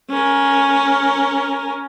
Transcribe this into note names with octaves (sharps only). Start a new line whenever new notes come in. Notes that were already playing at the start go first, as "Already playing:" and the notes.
C#4 A#4